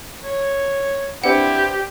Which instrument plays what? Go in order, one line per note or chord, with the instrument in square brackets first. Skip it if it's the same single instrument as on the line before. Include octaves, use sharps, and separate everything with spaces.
[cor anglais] C#5
[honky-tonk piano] C4 D4 B4 [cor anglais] E4 [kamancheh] G4 [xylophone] F#5